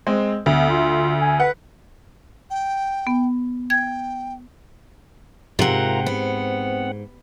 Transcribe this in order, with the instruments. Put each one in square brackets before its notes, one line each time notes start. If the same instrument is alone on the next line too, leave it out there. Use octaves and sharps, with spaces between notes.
[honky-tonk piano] G#3 C4
[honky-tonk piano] D2 [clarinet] B3
[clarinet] F4
G#5
[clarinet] B4 [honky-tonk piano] F#5
[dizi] G5
[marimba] B3
[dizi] G5 [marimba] G#6
[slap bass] G#2 [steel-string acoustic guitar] C3 F#5 [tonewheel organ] F4 A#4 A#5
[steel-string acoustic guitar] B3 [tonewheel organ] C4 F#5